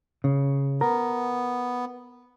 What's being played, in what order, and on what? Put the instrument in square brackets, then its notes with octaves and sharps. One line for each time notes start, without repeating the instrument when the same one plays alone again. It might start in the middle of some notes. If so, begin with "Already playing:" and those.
[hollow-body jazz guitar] C#3
[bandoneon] B3 [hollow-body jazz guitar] A#4